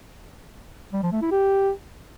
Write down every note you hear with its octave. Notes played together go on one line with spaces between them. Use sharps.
G3
F3
A3
E4
G4